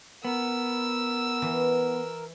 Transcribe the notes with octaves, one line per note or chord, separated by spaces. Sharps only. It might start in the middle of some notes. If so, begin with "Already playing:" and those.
B3 A#4 E6
E3